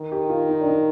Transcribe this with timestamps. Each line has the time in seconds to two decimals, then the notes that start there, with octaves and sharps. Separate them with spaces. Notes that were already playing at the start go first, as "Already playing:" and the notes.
Already playing: D#3
0.11 G4
0.30 F4
0.49 D#4
0.61 D4
0.67 D#4